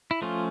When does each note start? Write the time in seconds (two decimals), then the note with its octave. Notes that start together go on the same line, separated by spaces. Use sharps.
0.11 E4
0.22 F3 A3 C#4 F4